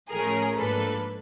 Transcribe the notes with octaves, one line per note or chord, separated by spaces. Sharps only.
A2 F3 A3 C#4 G#4 A#4
G#2 F3 A#3 D4 A4 B4